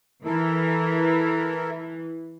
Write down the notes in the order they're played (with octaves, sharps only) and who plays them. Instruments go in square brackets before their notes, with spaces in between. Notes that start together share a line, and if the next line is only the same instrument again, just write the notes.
[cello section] E3 [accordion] E4 A4 A#4